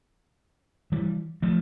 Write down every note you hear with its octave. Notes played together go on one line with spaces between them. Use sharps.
E3 G3
F3 A3